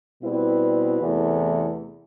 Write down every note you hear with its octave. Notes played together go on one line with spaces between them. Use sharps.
B2 G3 C4 E4 B4
E2 C3 E3 A3